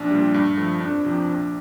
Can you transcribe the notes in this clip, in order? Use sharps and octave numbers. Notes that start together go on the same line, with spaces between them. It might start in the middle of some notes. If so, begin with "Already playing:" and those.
Already playing: A#1 D4
A#2 G3
G2
F3 A3
F2 D4
C3 F3
A#1